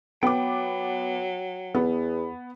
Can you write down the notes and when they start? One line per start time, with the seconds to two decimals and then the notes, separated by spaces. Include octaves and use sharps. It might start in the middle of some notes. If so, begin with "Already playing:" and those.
0.23 F#3 B3 G5 D6
1.75 E2 B3